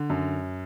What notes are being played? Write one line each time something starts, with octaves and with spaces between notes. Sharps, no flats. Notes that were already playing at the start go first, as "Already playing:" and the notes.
Already playing: D3
F#2